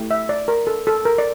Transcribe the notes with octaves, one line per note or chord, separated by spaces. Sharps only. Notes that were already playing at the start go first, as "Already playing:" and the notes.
Already playing: A3 E4 G4
E5
D5
A#4
A4
A4
A#4
D5